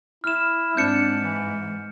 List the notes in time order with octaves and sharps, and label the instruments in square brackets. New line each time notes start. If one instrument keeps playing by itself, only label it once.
[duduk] E4 [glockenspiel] F6 E7
[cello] G#2 [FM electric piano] C4 [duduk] D4 [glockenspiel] G6 C#7 E7
[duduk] E3